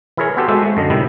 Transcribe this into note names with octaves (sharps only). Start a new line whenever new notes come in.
E3 E4 G#4 A#4 C#5
B3 C4 F#4 G4 A4 C5
G#3 A3 F#4 A4 C5 E5
G#3 A3
F#2 D3 D#5
A2 C3 D#3 G3 E4